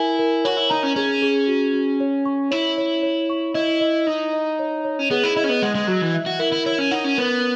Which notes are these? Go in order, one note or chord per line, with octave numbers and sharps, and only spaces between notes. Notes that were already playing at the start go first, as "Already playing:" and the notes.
Already playing: E4 A#4 G#5
A#4
F#4 C#5
E4
D#4 A#5
C#4
C#4 G#4
G#4
F#4
F#4
C#5
C#6
E4 C#5
C#5
C#5
C#6
E4 D#5
D#5
D#4 D#5
D#5
C#5
C#5
C#4
B3 G#4
E4
E4 D#5
C#4
B3
G#3 F#5
G#3
F#3 F#4
E3
E5
F#4
E4 A#4
E4
E4 C#5
C#4
D#4 F#5
C#4
B3 A#4